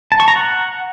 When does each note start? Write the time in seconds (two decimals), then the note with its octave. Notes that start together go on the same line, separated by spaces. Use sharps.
0.12 A5
0.20 C#6
0.28 A#5
0.36 F#5